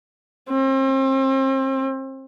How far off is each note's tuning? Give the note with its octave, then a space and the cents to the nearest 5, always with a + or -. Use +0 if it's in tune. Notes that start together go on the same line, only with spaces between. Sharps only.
C4 +35